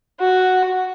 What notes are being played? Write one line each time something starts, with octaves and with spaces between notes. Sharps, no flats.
F#4